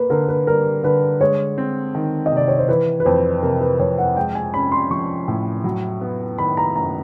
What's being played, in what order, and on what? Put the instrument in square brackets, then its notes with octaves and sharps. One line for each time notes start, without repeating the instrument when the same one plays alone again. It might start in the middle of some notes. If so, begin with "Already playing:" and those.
Already playing: [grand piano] A#3 [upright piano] B4
[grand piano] D3 [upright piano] A#4
[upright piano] B4
[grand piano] G3 [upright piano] A#4
[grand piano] D3 [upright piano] B4
[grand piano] G#3 [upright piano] C#5
[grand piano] C4
D#3
[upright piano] D#5
[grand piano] C3
[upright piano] D5
C#5
C5
[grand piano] E3 [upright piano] B4
[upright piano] B4
[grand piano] F2 [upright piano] C5
[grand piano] C3 [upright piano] A#4
[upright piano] B4
[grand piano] F2 [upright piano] C#5
[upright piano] F#5
[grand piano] G#3 [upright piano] G5
[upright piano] G#5
[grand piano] C#4 [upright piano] B5
[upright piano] C6
[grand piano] F3 [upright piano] C#6
[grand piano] A2
F#3
B3
[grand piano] D#3 [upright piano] B5
[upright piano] A#5
[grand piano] F#2 [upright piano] A#5